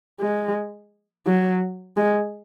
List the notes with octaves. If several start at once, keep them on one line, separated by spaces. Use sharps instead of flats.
G#3
F#3
G#3